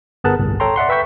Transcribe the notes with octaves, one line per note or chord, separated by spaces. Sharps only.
G1 B3 G#4 A#4 A5 F#6
G1 C2 A2
A4 C#5 G5 A#5 C6
D5 E5 F#5 C6
B4 E5 G5 C#6 G6 B6